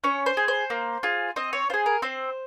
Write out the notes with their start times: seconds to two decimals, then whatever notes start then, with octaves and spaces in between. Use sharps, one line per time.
0.04 C#4 C#5
0.26 C5
0.37 G#4
0.48 C5
0.70 A#3
1.03 F4 G#4
1.36 C4 D#5
1.53 C#5
1.70 F4 G#4 C5
1.86 A#4
2.02 C4 C5